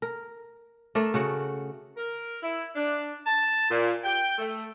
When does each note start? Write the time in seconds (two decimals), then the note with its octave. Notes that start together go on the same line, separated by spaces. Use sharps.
0.02 A#4
0.95 A3 D4 A4 A#4
1.14 C#3 F#4 F#5
1.96 A#4
2.42 E4
2.75 D4
3.25 A5
3.69 A#2
4.04 G5
4.38 A3